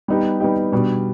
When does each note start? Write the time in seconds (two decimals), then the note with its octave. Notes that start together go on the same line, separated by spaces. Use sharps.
0.08 G3 B3 D#4 G4
0.40 G3 B3 D#4 G4
0.72 B2 G3 D4